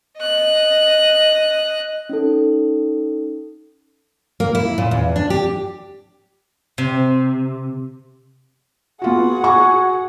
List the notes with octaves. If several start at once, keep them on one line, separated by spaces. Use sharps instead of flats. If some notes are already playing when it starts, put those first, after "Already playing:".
D#5 F#6
C#4 D#4 A4
A#3
E4
A#2
E2
D4
G4
C3
B3 F4 F#4 G#4 F#5
F#4 G#5 C#6